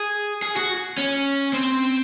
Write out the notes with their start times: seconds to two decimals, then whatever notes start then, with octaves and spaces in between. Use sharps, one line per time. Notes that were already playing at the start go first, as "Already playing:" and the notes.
Already playing: G#4
0.42 G#4
0.57 F#4
0.98 C#4
1.53 C4